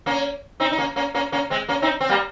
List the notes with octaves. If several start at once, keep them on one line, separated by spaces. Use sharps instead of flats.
A#3 C#4
C4 D#4
D#4
A#3 C#4
A#3 C#4
A#3 C#4
A#3 C#4
G#3 C4
A#3 C#4
C4 D#4
C4
G3 A#3